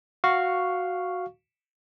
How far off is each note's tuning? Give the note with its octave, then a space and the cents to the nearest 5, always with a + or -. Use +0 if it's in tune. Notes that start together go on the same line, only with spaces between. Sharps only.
F#4 -5 F5 +0 C#6 +0